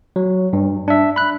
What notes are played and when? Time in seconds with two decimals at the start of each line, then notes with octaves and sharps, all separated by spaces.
0.16 F#3
0.53 G2
0.88 D4 E5
1.16 B5 F#6